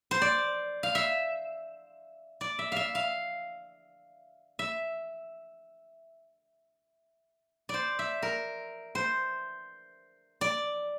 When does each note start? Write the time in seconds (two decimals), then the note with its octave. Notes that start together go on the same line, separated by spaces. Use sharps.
0.11 C5
0.22 D5
0.83 F5
0.95 E5
2.41 D5
2.59 E5
2.72 E5 F5
2.95 F5
4.59 E5
7.69 C5 D5
7.99 E5
8.22 A#4
8.95 C5
10.41 D5